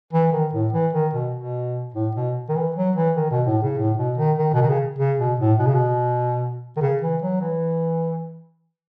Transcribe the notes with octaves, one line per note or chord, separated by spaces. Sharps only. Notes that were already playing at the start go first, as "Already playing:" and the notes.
E3
D#3
A2
E3
D#3
B2
B2
A2
B2
D#3
E3
F#3
E3
D#3
B2
A2
C#3
A2
B2
D#3
D#3
B2
D#3
C#3
C#3
B2
A2
B2
C#3
B2
D#3
C#3
E3
F#3
E3